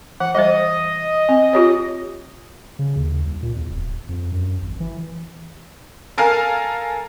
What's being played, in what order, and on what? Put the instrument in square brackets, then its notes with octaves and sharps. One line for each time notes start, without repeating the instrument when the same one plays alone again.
[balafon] E3 [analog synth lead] F#5
[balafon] E3 G3 C5 [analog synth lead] D#5
[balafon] C4
F4 G4 C#5
[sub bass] C#3
D#2
C2
A#2
E2
D1
F2
F#2
G#1
E3
[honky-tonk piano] A4 A#4 F5 G#5 F6